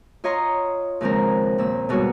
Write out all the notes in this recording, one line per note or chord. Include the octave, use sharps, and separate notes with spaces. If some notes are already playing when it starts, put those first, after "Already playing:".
F4 C#5 D#5 A#5 C6 C#6
D#2 C#3 F3 G#3 C4 A#4
D#2 A#2 E6
G#2 B2 G3 F#4 C#5